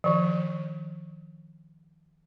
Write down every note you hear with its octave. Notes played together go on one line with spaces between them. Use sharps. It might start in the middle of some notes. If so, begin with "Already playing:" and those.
D#3 F3